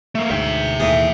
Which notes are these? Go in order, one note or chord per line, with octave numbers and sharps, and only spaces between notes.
A3 A#3
D2 G#2 E5 G5
D#2 A2 E3 G#4